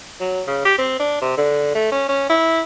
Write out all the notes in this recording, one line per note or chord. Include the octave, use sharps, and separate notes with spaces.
F#3
C#3
G4
C4
D4
C3
D3
A3
C#4
C#4
E4